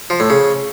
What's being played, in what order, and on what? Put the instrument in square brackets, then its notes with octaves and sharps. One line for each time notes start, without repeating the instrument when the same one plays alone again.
[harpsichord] F3
A2
C#3